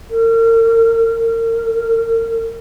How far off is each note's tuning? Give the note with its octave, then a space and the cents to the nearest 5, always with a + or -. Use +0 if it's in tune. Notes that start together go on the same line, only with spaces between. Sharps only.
A#4 -35
A#4 -35